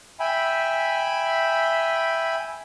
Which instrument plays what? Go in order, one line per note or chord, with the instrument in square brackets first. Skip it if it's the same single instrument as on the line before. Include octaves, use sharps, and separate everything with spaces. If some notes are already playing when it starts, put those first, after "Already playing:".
[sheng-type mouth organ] E5 G5 G#5 B5